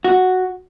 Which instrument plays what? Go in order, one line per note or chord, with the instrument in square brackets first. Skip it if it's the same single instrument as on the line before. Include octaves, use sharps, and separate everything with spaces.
[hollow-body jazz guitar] F#4